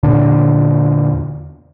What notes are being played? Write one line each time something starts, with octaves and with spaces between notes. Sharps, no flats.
E2 A#2 D3 D4